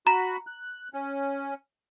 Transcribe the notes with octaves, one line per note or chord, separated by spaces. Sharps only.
F#4 A#5 B5
F#6
C#4